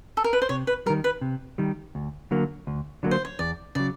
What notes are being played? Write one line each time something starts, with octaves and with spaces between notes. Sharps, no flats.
A4
A#4
B4
C5
C3 C#5
B4
D#3 G3 A#4
B4
C3
D#3 G3
D2
D3 F#3 A#3
D2
D3 F#3 A#3
C5
C#5
E2 D5
C#3 F#3 D5